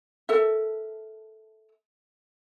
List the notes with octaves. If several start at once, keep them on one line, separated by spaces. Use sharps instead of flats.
A4 A#4 E5